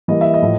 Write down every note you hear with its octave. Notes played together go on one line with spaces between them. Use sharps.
E3 G3 A#3 D#5
E5
D#5
A2 F3